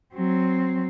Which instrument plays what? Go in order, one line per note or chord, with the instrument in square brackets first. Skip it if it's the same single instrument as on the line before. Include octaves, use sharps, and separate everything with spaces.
[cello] F#3 C4